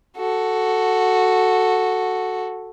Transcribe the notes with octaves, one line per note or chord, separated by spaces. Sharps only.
F#4 A4